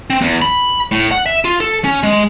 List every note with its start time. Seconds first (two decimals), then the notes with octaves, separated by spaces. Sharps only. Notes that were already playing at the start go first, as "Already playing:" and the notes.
0.10 C4
0.21 E2
0.42 B5
0.91 A2
1.11 F#5
1.26 E5
1.45 F4
1.60 A4
1.84 C#4
2.03 G#3